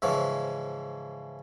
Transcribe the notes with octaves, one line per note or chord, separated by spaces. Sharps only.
G#2 C#3 E3 F3